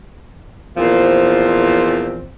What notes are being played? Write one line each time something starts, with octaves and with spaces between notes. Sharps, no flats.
E2 A#2 F3 C4